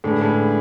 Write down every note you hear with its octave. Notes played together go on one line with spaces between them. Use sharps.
A2 D3 G#3 D4 G#4 B4
A2